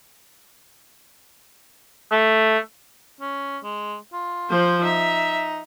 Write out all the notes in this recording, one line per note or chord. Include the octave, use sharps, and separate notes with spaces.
A3
C#4
G#3
F4
F3 C5
D#4 E5